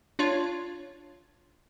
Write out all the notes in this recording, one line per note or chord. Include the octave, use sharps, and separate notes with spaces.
D4 F4 C#5